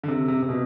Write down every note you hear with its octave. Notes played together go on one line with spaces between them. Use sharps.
D3
C3
C3
C3
B2